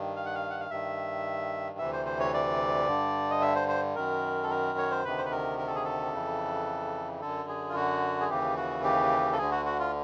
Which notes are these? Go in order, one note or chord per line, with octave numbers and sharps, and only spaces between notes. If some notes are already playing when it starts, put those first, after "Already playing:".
Already playing: G2 D#3
F5
F#5
F5
F#5
F5
G2 D#3 E5
D2 C3 E3 E5
C5
C5
C#5
D5
G2 D3
D#5
E5
C5
C5
F#2 D#3 A#4
A4
A#4
C#5
C5
D2 C3 D#3 B4
C5
B4
A#4
A#4
A4
G#4
A4
F2 C#3 E3
F#2 D3 A4
G#4
F4
F#4
G#4
D#2 C#3 E3 G4
F#4
G4
A4
D2 D3 G#4
F#4
F#4
F4